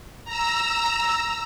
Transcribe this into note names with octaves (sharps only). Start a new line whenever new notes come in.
A#5 E6